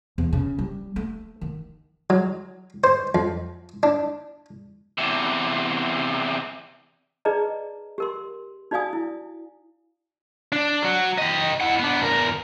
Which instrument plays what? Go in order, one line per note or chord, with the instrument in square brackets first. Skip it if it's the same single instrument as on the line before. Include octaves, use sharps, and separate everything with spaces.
[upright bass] E2
C#3
G3
A3
D#3
[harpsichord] F#3
C5
F2
D4
[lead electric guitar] E2 C3
[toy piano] D#4 G#4 B4 D5 D#5 A#5
G4 A#4 C6
D#4 F#4 D5 F5 G#5 D#6
E4
[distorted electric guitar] D4
F#3 F#4
G4 D#5
E4 F#5
B3 D4
E2 A#4